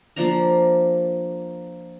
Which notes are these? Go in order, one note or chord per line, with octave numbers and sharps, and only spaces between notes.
F3 A#3 D4 A#5